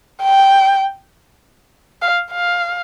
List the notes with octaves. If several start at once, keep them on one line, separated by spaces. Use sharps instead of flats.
G5
F5
F5